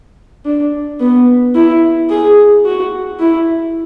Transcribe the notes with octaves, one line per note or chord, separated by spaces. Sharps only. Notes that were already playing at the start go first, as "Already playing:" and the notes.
D4
B3
E4
G#4
F#4
E4